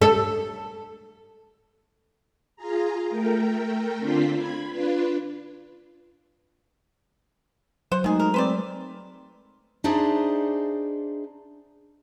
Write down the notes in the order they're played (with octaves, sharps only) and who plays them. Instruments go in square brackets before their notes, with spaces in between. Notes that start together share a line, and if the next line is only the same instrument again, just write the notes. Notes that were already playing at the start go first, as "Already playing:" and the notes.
[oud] A4
[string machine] F4 G#4 A#5
A3 A#4 G5
D3 C4 D4 F4 C6 B6
B5 G#6
D4 F4 B4
[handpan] F#3 [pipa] C5 F#5
[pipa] D#3 G#4 [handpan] G#3 A3 [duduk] D#4
[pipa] A#4
[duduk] C4 [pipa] B4 C5 D5
[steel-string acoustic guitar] D4 D#4 G#4 C5 D5 E5